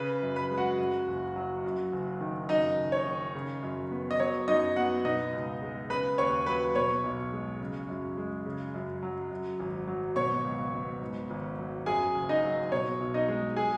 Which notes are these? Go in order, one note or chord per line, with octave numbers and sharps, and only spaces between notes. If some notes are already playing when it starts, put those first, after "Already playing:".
Already playing: C#3 B4 B5
F#2
B4 B5
G#3
F#4 F#5
F#2
F#1
F#3
F#2
F#1
D#3
F#2 D#4 D#5
F#1
C#5
D#3
C#3
F#2
B3
D#5
F#3 C#5
F#2 D#4 D#5
B3 F#4 F#5
B2 D#4 D#5
C#2
G#3
C#3 B4 B5
D#2 C#5 C#6
F#3 B4 B5
B2 C#5 C#6
B1
G#3
C#3
F#2
G#3
C#3
F#2
F#3
F#2
G#1
F#3
B2 C#5 C#6
C#2
B3
G#2
G#1
F#3
F#2 G#4 G#5
F#1
D#4 D#5
F#3
B2 C#5
B1
D#4 D#5
G#3
G#4 G#5